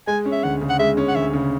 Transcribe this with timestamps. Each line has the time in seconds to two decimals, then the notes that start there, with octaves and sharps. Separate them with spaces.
0.07 G#3 G#5
0.25 C#4
0.32 E5
0.43 D2 F#5
0.61 C#3
0.69 F#5
0.79 G#3 E5
0.97 C#4
1.08 F#5
1.15 D2 E5
1.33 C#3